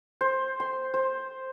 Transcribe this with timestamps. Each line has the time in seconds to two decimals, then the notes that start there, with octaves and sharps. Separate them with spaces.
0.21 C5
0.60 C6
0.94 C5